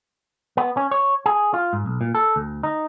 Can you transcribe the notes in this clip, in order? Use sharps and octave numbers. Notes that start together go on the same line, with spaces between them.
B3
C#4
C#5
G#4
F4
G#2
B1
A#2
A4
D2
D#4